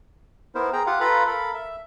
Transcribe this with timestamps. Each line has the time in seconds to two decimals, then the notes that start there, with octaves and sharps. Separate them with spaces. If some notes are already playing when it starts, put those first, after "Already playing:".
0.55 B3 E4 A#4 C5
0.73 G#4 G5 A#5
0.87 F4 G4 F5 F#5
1.00 F4 A4 B4 F5 A#5 B5
1.27 A4 A#4 F5 B5
1.54 E5